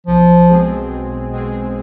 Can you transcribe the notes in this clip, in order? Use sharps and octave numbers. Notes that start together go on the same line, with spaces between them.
B1 F3
B2 G#3 C4 G#4
B1
B2 G#3 C4 G#4